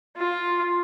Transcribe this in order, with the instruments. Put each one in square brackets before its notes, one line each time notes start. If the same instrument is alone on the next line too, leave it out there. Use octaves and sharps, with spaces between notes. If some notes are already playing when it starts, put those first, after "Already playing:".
[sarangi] F4